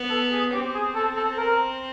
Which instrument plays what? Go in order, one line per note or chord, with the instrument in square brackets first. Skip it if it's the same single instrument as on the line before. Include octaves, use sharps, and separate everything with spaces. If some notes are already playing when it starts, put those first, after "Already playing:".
Already playing: [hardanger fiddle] B3
[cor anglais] A4
G#4
[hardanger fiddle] C4 [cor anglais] G4
[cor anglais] G#4
A4
A4
A#4